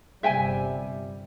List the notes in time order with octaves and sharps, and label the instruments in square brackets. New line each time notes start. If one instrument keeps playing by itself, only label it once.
[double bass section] G1 C3 G3 [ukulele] E5 G5 G#5